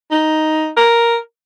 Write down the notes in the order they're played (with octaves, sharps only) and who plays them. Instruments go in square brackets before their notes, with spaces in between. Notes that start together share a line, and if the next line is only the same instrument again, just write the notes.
[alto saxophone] D#4
A#4